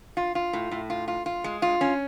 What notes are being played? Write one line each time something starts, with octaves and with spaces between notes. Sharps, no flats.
F4
F4
A2
A2
F4
F4
F4
G#3
F4
C#4